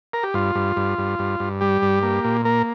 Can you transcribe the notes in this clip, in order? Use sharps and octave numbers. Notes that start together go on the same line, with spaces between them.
A#4
G4
G2 F4
G2
G2
G2
G2
G2
G3 G4
G2
A#3
A#2
A#3 A#4